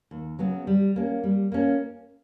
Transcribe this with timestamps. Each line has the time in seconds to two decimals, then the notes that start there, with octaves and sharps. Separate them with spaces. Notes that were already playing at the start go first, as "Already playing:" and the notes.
0.11 D#2
0.39 C#3 F#3 B3
0.67 G3
0.96 A#3 C#4
1.24 G3
1.52 A#3 C#4